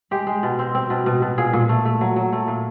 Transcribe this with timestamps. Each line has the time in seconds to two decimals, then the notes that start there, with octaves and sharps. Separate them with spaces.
0.11 G#3 G4
0.27 G#3
0.43 B2
0.59 C4
0.75 C4
0.90 B2
1.06 B2
1.22 B2
1.38 A#2 G#4
1.53 A#2
1.69 A3
1.85 A3
2.01 F#3
2.16 F#3
2.33 A3
2.48 A#2